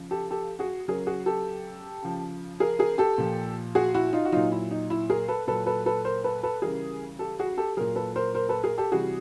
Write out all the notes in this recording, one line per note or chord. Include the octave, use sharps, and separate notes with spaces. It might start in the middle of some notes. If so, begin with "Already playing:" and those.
Already playing: C#3 F3
G4 A4
G4 A4
F#4 G#4
C#3 F#3 G#4 A#4
F#4 G#4
G4 A4
C#3 F3
G#4 A#4
G#4 A#4
G4 A4
A#2 F3
F#4 G#4
E4 F#4
D#4 F4
F#4
A#2 F#3 D#4 F4
E4
D#4
E4
G#4 A#4
A4 B4
A#2 F#3 A4 B4
A4 B4
A4 B4
A#4 C5
A4 B4
A4 B4
C#3 E3 G3 G#4 A#4
G4 A4
F#4 G#4
G4 A4
A#2 F#3 G#4 A#4
A4 B4
A#4 C5
A#4 C5
A4 B4
G#4 A#4
G4 A4
C3 E3 G3 F#4 G#4